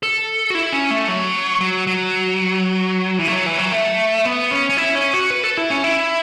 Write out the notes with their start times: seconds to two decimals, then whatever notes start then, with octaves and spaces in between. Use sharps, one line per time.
0.03 A4
0.50 F#4
0.55 E4
0.73 C#4
0.91 A3
1.08 F#3
1.61 F#3
1.87 F#3
3.19 E3
3.28 A3
3.32 F#3
3.46 E3
3.58 F#3
3.72 A3
4.25 B3
4.51 C#4
4.69 C#4
4.77 E4
4.95 C#4
5.13 F#4
5.30 B4
5.44 A4
5.57 E4
5.70 C#4
5.84 E4